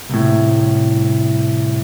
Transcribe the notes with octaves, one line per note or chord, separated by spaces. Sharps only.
C2 A2